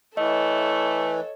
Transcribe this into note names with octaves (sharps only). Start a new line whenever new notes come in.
E3 A3 A4 C#5 D#5